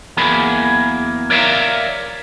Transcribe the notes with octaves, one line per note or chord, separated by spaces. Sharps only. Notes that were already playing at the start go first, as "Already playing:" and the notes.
E2 F#3 A#3 G#4 B5
A#4 C#5 D5 E5 F5 A#5